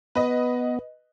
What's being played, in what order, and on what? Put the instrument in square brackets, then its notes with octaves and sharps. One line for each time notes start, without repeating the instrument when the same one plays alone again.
[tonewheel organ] B3 [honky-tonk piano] B4 D#5